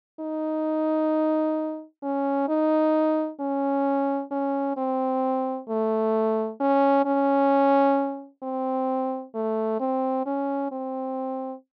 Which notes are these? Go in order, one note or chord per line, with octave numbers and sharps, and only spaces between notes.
D#4
C#4
D#4
C#4
C#4
C4
A3
C#4
C#4
C4
A3
C4
C#4
C4